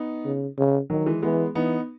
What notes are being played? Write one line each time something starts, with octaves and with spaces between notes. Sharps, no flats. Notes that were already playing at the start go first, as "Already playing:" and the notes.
Already playing: B3 D#4
C#3
C#3
D#3 F#3
E3 G#3
E3 G#3 B3
E3 B3 D#4